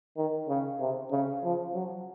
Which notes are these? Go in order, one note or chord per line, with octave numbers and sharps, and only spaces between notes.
D#3
C#3
C3
C#3
F3
F#3